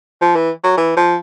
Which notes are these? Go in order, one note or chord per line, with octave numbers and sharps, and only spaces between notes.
F3
E3
F#3
E3
F3